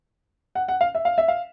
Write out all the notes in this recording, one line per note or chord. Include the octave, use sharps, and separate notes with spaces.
F#5
F#5
F5
E5
F5
E5
F5